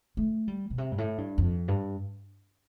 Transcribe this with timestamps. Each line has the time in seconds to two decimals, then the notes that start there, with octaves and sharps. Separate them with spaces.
0.17 A3
0.48 G3
0.70 B2
0.78 C3
0.91 G2
0.98 A2
1.18 G2
1.38 F2
1.68 G2